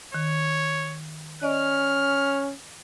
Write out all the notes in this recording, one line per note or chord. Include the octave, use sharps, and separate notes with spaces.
D#3 C#5
C#4 D5 D#5 F6